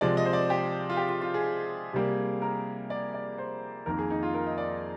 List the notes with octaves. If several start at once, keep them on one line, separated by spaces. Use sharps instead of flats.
C3 F3 G#3 D5
D#5
C5
D5
G4
F4
G4
F4
F4
G#4
C3 G3 A#3
A#4
D5
D5
C5
F2 D#3 A#3 A#4
G#4
D#4
F4
A#4
D#5
D5